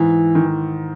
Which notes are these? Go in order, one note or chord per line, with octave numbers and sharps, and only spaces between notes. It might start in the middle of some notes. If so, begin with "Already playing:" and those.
Already playing: G#2 E3
D#3